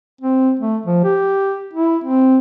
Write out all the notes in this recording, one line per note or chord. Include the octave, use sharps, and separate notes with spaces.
C4
A3
F3
G4
E4
C4